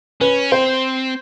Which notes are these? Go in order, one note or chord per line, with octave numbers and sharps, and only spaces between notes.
C#4 B4
C4 C5